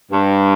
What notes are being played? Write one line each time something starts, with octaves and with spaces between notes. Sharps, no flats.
G2